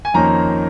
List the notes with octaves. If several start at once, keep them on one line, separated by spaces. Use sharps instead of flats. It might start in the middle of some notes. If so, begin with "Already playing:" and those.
G#5
F2 D#3 A#3 C#4 A#5